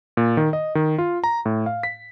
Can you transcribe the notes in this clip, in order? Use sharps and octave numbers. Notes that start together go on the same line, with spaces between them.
A#2
D#3
D#5
D#3
F4
A#5
A2
F5
B6